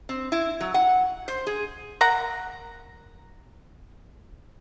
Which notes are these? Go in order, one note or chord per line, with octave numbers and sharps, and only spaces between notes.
C4
E4
F#3
F#5
C5
G#4
A#4 F#5 A#5